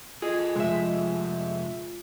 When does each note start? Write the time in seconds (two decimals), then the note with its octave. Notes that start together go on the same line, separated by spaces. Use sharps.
0.22 F4 G#4 A4 D#5
0.56 C3 F3 G#3 E5